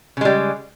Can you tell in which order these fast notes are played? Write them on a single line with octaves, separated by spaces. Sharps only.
C#3 G#3 G3